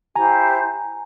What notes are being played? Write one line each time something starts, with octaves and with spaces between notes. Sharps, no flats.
E4 G4 C5 G#5 A#5